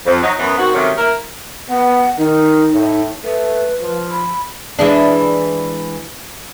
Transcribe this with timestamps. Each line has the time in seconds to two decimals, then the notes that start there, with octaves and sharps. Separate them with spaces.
0.06 F2
0.23 F#3 D#4
0.39 F#2 E3 B3
0.58 D#3 C4 F#4
0.74 C3 D#3 F#3 A3 C#4
0.97 A#3 E4 A#4
1.69 B3 F#5
2.18 D#3 D#4
2.73 A2
3.24 A3 B4
3.81 F3
4.11 B5
4.79 E3 G#3 D4